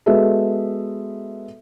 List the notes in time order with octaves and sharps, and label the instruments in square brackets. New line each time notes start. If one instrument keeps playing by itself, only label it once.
[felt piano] G#3 B3 F#4 G#4 A4 E5